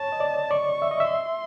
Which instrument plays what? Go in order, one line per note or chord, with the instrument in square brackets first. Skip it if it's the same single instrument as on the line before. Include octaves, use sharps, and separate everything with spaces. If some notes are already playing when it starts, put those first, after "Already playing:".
Already playing: [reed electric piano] C#5 [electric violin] A5
[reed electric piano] D#5
D5
[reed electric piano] D5 [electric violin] C#6
[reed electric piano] E5
D#5
E5
[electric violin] C6